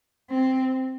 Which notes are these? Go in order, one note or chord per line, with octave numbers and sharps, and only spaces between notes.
C4